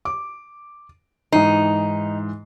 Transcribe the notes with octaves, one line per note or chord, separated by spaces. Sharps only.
D6
G#2 E3 D#4 C7